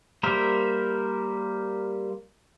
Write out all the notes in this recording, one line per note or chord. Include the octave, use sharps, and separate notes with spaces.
G3 A#3 A#4 C5 E5